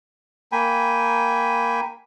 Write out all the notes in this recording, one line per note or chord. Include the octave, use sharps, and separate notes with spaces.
A#3 G5 G#5 B5